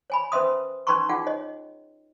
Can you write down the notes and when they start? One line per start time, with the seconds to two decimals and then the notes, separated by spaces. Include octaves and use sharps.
0.10 C#5 G#5 B5
0.32 C#4 B4 C5 E5 C6 D#6
0.87 C#4 D#4 B4 A#5 C6 C#6
1.09 D#4 F4 G#4 F#5 G5
1.27 C#5 D#5